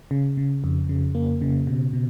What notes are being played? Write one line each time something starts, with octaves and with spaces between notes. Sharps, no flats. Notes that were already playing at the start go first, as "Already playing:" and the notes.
C#3
C#3
F2
C#3
A#3
C#3
B2
B2